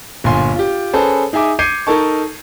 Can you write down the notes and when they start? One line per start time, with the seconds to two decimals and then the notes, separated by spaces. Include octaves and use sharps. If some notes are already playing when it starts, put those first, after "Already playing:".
0.24 G1 A#2 F4 G#5 C6
0.55 F4 G4
0.93 C#4 G#4 A4 B4 C5 A5
1.33 D#4 G#4 E5 G#5 D6
1.59 D6 G6 G#6 C7 C#7 D#7
1.87 D#4 A4 A#4 A5 C#6